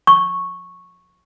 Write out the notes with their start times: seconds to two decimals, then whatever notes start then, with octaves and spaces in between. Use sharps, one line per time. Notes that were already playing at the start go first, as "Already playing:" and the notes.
0.07 C#6